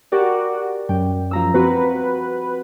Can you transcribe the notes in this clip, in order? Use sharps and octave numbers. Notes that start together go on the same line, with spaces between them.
F#4 G4 A#4 D5
F#2 G5
F3 A#5 E6
C4 F#4 B4